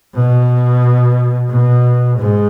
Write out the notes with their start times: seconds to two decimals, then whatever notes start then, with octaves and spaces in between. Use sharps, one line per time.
0.15 B2
1.50 B2
2.18 G#2